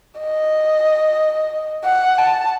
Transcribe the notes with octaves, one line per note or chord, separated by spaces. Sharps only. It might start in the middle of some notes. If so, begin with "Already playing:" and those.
D#5
F#5
A5